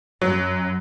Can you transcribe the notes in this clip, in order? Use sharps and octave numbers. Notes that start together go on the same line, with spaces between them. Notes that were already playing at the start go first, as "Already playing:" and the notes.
F#2 F#3